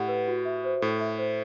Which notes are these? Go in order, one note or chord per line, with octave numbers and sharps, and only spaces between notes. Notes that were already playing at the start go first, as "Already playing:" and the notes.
Already playing: A2 G4 F#5
B4
F#4
E5
C5
A2 A4
E5
C5